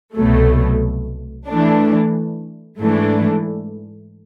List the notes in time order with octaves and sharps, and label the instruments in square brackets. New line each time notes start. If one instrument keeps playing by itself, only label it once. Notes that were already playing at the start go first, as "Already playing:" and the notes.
[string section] C2 B2 F#3 A3
E3 A3 D4
G#2 E3 A3 D4